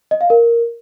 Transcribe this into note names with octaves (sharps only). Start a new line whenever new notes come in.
D#5
F5
A#4